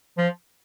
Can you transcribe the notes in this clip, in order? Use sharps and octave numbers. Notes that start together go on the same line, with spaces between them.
F3